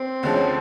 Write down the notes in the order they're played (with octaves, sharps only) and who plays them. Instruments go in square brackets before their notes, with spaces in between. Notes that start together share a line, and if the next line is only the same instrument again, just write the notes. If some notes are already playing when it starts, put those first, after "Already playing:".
Already playing: [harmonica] C4
[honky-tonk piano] D2 D3 F3 G#3 C#4